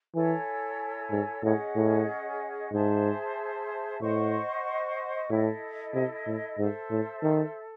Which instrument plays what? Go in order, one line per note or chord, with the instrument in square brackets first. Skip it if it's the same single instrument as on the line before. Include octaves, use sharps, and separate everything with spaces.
[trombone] E3 [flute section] E4 A4 C#5 G#5
[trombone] G#2
[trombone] A2 [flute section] C#4 G#4 D#5 F#5
[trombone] A2
[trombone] G#2 [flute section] G#4 C5 E5 A5
[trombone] A2 [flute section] C5 D#5 F#5 C#6
[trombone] A2 [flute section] E4 A4 D#5
[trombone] C3
A2
[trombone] G#2 [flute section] A4 C5 E5
[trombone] A2
D#3